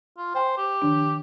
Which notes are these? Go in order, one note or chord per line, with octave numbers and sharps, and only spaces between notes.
F4
C5 G5 G#5 C6
G4
D#3 F3 D4